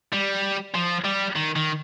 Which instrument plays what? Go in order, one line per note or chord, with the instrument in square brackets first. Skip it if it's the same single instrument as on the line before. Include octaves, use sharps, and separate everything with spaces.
[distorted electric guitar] G3
F3
G3
D#3
D#3